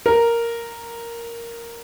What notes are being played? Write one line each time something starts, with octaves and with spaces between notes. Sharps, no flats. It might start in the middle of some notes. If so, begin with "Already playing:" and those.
A#4